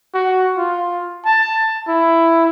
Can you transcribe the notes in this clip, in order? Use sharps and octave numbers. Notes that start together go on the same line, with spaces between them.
F#4
F4
A5
E4